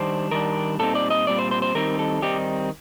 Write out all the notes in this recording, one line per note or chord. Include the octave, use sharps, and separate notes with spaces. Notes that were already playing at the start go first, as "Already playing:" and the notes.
Already playing: D#3 G3 D4 C5
D#3 G3 D4 A#4
A#2 G3 C4 D#4 A4
D5
D#5
A#2 G3 C4 D5
C5
C5
C5
D#3 G3 C4 D#4 A#4
A4
D#3 G3 C4 D#4 G4